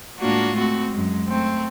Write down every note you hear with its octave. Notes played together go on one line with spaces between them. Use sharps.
A2 G#3 A#3 D4 F4 F#4
A3 C4 F#4
F#2 G#3
A3 C4